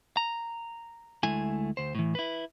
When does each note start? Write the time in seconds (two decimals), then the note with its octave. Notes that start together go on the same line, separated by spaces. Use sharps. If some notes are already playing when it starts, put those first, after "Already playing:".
0.17 A#5
1.23 D2 G#3 A3 E4 G#5
1.77 D2 C5
1.95 A2 E3
2.15 E4 B4